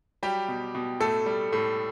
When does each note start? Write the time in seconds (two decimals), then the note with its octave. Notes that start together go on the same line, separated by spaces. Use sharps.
0.23 F#3 G3 G4
0.48 B2
0.75 B2
1.00 A2 A3 A4
1.26 G3
1.53 A2